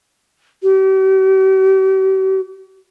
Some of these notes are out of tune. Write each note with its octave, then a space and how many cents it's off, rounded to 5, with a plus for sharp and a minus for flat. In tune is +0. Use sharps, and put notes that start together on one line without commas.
G4 -45